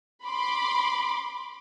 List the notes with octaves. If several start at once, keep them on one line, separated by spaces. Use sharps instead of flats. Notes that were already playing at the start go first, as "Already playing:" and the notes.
B5 C6 D6